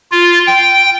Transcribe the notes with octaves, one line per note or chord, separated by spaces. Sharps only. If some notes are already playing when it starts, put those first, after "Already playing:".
F4
G5